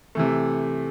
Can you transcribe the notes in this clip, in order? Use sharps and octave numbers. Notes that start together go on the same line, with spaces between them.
C3 E3 A3